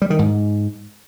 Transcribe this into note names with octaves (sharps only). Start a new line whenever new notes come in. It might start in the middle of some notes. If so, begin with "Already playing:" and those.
G3
D#3
G#2